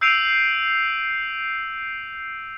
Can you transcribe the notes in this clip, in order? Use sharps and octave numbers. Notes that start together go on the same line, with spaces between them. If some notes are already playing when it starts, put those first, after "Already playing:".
E6 G6 C7 D7 D#7 F7